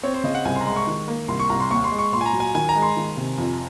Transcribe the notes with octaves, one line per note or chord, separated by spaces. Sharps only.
C4 C#5
C5
C#3 D#5
F#5
C2 G#5
C6
A#5
G#3 C6
C#6
D#3
A#3
C2 C6
C#6
C2 A#5
C6
D#2 C#6
C6
G#3
C#6
A#2 C6
G#5
A#5
F#3
G#5
D#3 G#5
A#5
G#3
C6
D#3
C3
F2